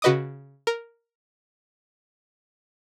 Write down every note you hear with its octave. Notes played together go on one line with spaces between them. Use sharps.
C#3 F#4 B4 D#5 D6 D#6
A#4